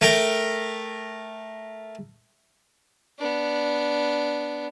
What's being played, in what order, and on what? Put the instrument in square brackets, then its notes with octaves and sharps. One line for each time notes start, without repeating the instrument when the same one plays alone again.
[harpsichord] A3 A#4 G5
[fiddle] B3 D4